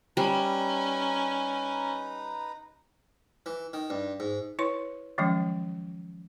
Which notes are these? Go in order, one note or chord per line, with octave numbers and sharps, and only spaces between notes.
G3 C#4 D#4 B4 A#5
E3
D#3
G2
G#2
E4 B4 C#5 C6
D#3 F3 F#3 G#3 C#4